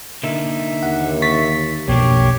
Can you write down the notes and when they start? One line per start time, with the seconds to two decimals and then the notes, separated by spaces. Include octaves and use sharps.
0.23 D3 A#3 D#4 E5
0.83 D#2 F#5
1.22 C#6 A6 B6
1.88 B1 F2 B2 A#3 D4 G4 C#5